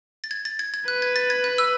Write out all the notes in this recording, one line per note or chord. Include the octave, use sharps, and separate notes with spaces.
A6
G#6
A6
G#6
G#6
B4 F#6
G#6
A6
G#6
F#6
E6